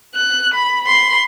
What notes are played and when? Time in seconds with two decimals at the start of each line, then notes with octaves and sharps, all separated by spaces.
0.15 F#6
0.54 B5
0.84 B5 C6